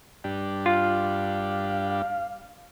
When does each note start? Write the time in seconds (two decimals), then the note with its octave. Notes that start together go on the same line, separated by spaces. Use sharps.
0.24 G2 D4 G4
0.66 F4 F5